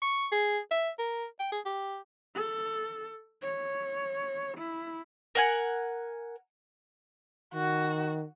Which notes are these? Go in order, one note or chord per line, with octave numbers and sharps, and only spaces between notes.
C#6
G#4
E5
A#4
G5
G#4
G4
A4
C#5
E4
A#4 F#5 G#5
D#3 F#4